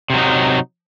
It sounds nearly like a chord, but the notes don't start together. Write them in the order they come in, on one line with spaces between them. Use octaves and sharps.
C3 F#3 D#4